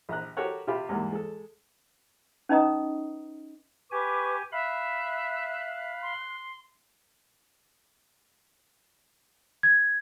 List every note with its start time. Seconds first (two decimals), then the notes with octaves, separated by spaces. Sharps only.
0.09 A#1 A#5 F#6
0.37 F#4 G4 A4 A#4 C#5 F#5
0.67 C3 F4 G4 B5
0.89 E2 G#2 G3 A#3
1.12 G#3 A4
2.49 C#4 D#4 B4 D#5 A#5 D#6
3.91 G4 B4 G#5 C#6 D6
4.52 E5 F5 B5 F#6
6.02 C6
9.63 G#6